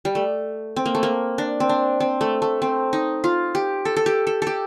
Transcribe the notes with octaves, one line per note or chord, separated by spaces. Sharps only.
G3
A3
C4
A#3
A3
A#3
D4
C4
D4
C4
A3
A3
C4
D#4
F4
G4
A4
A4
G4
A4
G4 A4